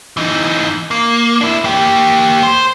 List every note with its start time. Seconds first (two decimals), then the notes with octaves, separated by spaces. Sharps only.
0.17 E3 D#4
0.91 A#3
1.41 D4 E4
1.64 A#3 G4
2.43 C5